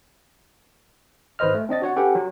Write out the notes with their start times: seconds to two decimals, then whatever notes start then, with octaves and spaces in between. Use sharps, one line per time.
1.39 G#1 B4 C5 D#5 F6
1.55 A3
1.69 C4 D4 D#5 A6
1.82 F#4 C#5 F#5
1.96 C#4 G4 A4 B4 F#5 G5
2.15 F#3